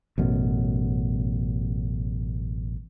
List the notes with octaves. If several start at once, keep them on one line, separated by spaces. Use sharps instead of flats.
A1 F#2 B2